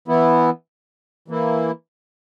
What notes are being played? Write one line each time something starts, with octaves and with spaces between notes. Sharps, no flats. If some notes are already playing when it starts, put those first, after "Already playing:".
E3 B3 E4
E3 A#3 E4